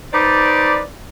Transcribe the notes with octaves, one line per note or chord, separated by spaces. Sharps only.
D#4 B4 C5 D5